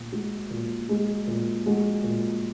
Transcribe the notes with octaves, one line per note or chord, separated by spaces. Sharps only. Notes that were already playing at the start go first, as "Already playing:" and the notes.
Already playing: A#2
G#3 F#4
A#2
G#3 F#4
A#2
G#3 F#4
A#2